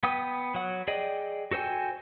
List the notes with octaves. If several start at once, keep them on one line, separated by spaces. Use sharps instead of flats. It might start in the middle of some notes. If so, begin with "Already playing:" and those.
B3 G5 D#6
F#3 F#5
G#4 D5 D#5 G5
F#4 A4 C5 G5 G#5